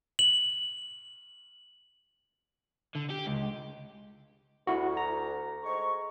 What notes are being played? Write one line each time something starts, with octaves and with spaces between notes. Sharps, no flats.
F#7
D3
G4
C#2
D2 E4 F#4
A#5
G#2 C#6